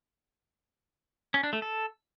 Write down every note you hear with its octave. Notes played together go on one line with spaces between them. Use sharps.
C#4
D4
A3
A4